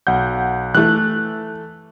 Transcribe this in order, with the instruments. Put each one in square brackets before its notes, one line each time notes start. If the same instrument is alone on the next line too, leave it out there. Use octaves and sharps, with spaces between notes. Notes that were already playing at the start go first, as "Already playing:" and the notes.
[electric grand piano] B1 F#5 G6
[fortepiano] E3 A3 [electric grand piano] F#6